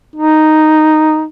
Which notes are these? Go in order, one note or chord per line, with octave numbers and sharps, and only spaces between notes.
D#4